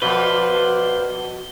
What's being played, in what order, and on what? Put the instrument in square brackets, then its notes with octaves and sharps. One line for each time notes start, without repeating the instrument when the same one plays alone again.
[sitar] F2 B2 [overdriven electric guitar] B4 [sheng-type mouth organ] C5 D5 F5 [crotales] G7